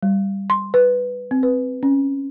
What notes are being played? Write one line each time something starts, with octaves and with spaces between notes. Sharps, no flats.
G3
C6
B4
C4
B4
C#4